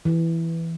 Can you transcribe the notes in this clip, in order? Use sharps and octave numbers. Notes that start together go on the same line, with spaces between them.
E3